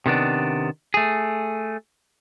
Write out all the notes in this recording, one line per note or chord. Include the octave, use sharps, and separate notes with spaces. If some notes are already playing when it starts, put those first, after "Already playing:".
C3 D#3 B3 D4
A3 G#4